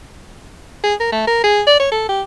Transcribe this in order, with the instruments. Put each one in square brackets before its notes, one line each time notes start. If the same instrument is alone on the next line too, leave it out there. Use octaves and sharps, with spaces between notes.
[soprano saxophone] G#4
A#4
A3
A#4
G#4
D5
C#5
A4
G4